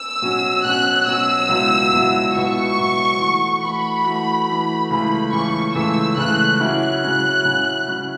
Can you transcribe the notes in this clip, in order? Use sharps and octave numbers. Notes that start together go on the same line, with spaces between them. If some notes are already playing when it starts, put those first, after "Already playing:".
Already playing: E6
B2 F#3 C#4
B2 F#3 C#4 F#6
B2 F#3 C#4 E6
C#2 B2 F#3 B3 E4
C#2 B2 F#3 B3 E4
C#2 B2 F#3 B3 E4 C#6
C#2 B2 F#3 B3 E4
E3 A3 F#4
E3 A3 F#4 B5
E3 A3 F#4
E3 A3 F#4
C#2 C#3 E3 A3 B5
C#2 C#3 E3 A3 C#6
C#2 C#3 E3 A3 E6
C#2 C#3 E3 A3 F#6
C#3 F#3 C#4 E4 F#6
C#3 F#3 C#4 E4
C#3 F#3 C#4 E4
C#3 F#3 C#4 E4